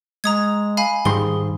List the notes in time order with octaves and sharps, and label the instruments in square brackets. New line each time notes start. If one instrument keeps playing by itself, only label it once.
[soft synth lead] G#3 [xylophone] A#5 D#6 G#6
[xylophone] F5 G#5 B5
[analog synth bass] G#2 [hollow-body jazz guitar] D#3 G3 C6 [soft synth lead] G#4 [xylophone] G7